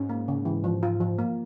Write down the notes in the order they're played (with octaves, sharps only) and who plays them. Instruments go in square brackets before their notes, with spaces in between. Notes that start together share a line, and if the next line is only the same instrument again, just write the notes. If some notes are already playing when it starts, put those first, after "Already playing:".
Already playing: [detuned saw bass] G#2 [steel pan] C#4
[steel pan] A#3
C#3
E3
F3
F4
F3
A#3